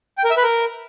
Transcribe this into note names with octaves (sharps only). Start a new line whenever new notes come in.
G5
A#4
E5
B4
A#4